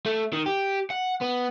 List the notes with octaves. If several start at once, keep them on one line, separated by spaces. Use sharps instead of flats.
A3
D#3
G4
F#5
B3